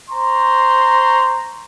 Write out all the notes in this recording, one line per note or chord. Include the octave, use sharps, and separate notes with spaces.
C5 A#5 C6 C#6